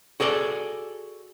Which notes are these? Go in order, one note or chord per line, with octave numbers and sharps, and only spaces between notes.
F#4 G#4 A4 D5